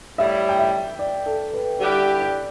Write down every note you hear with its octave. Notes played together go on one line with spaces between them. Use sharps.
A2 G3 E4 E5
G5
E5
D5
A4
B4
D3 G3 E4 G4 B4
D5